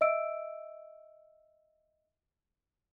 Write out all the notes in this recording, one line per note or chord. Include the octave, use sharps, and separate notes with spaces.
D#5 E5 E6 D7